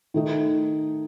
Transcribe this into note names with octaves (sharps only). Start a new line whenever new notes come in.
D#3 A3 D#4